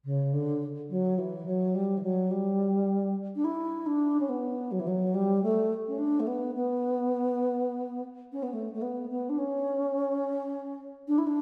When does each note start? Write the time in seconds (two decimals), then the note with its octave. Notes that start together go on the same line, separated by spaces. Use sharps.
0.04 C#3
0.33 D3
0.90 F#3
1.18 E3
1.46 F#3
1.74 G3
1.97 E3
2.03 F#3
2.31 G3
3.35 D4
3.44 E4
3.86 D4
4.20 C#4
4.29 B3
4.71 F#3
4.79 E3
4.87 F#3
5.14 G3
5.42 A3
5.88 C#4
5.98 D4
6.19 A3
6.27 B3
6.55 B3
8.32 C#4
8.42 B3
8.53 A3
8.73 A3
8.81 B3
9.10 B3
9.29 D4
9.38 C#4
11.08 D4
11.18 E4
11.27 D4